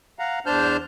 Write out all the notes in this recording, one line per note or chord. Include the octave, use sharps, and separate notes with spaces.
F5 F#5 A#5
E2 D4 C5 A5 F6 G6